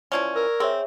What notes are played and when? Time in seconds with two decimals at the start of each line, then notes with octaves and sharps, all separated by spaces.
0.12 E3 F3 C#4 D5 C#6 G#6
0.36 A#4 E6
0.60 C4 G#4 C#5 E5